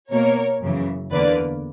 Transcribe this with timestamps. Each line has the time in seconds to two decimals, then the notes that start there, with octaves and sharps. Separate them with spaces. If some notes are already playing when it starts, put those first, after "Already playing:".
0.11 B2 A#3 A#4 C#5
0.61 F#2 C#3 E3
1.12 E2 D3 A#3 B4 D5